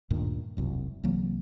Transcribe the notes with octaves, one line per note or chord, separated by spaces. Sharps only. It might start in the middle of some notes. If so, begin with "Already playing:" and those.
D2 G2 A#2 D#3
E1 C2 F#2
C2 E3 F#3 A#3